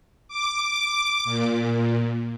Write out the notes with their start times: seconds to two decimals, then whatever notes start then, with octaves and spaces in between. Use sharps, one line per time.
0.28 D6
1.24 A#2